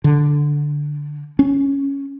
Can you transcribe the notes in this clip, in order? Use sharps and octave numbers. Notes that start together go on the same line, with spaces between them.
D3
C#4